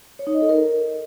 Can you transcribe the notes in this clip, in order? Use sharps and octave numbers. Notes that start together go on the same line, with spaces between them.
C#5
D#4
D#5
A4
A#4